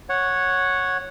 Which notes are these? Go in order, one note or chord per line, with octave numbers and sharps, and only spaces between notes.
C#5 F#5